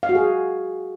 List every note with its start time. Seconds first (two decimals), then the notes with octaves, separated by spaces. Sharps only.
0.03 F5
0.09 F#4
0.15 G#4